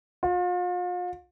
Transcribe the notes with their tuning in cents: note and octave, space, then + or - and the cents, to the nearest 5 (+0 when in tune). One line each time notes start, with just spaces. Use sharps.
F4 +40